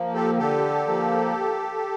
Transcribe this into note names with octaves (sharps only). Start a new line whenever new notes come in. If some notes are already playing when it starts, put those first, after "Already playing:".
Already playing: F3 A#3
G4 A4
D3 G4 A4
F3 A#3